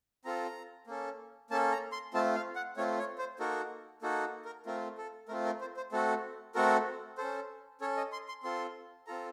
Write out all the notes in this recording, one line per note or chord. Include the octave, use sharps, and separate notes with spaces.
C4 F4 A4 A#5
A#3 C#4 A4
A#3 C#4 A4 A5
A#5
C6
A3 C4 F4 A5
F5
F#5
A3 C4 F4 C#5
C#5
C5
A#3 D#4 F#4 A4 A#4
A#3 D#4 F#4 A4
A#4
A3 C4 F4 A#4
A4
A3 C4 F4 A#4
A#4
C5
C5
A3 C4 F#4 A4
A3 C4 F#4 A4 A#4
C#4 A4 C5
C#4 A4 C#5
D#5
C6
C6
C4 F4 A4 C6
C4 F4 A4 A#5